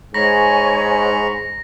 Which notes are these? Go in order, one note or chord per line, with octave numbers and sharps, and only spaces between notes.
G#2 C#5 G#5 A#5 B5 C#6 A#6